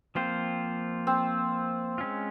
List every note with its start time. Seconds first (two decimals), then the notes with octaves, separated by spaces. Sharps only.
0.15 F3 A#3 C4 F4 C5
1.07 C4
1.98 G#3 C#4 F4